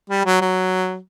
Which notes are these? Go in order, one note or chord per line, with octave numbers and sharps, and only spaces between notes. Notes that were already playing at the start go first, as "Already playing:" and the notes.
G3
F#3
F#3